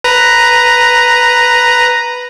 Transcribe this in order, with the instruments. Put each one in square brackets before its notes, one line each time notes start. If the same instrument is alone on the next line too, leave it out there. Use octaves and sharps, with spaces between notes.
[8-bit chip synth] B4 A#5